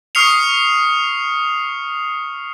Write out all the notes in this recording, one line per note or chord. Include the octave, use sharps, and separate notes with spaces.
C#6 D#6 F6 C7 C#7 F7